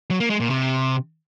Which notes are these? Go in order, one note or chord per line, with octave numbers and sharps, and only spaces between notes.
F#3
A#3
G#3
A#2
C3